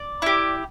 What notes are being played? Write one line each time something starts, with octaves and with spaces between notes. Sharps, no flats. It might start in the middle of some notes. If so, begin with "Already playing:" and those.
Already playing: D5
E4 G4